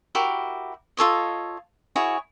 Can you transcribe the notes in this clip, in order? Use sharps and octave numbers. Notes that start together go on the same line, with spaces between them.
E4 F#4 G4 A#4
F4 A4 C#5 D#5
E4 F#4 G#4 C#5